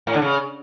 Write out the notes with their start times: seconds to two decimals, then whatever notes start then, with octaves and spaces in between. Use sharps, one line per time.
0.07 A2
0.14 D3
0.22 C#3